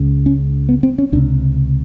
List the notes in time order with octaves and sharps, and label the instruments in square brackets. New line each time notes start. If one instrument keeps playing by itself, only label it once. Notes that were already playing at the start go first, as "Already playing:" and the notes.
Already playing: [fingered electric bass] C#2 C#3
C#4
B3
C4
C#4
C#2 C3 D4